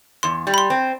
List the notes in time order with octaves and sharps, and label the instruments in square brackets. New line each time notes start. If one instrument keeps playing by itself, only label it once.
[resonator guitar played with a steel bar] E2 [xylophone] C6
[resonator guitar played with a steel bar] G3
[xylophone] B5
C6
[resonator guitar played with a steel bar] C4